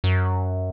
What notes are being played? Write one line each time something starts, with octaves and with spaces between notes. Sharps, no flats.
F#2